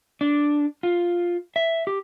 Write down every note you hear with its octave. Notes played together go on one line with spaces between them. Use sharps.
D4
F4
E5
G4